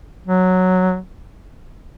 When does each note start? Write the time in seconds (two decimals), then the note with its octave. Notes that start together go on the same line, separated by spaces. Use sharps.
0.27 F#3